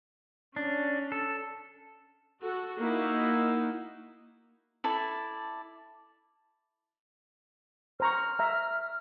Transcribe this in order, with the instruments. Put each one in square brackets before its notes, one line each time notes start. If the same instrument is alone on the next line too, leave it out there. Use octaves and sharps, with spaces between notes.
[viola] C#4 [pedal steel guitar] D4
[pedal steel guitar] A4
[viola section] F#4 A4
A#3 D#4 E4 F#4
[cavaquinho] E4 A4 D5
[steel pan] C5 A#5 C#6 [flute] F6
[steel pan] E5 A#5